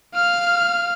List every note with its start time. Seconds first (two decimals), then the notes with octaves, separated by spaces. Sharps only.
0.14 F5 F6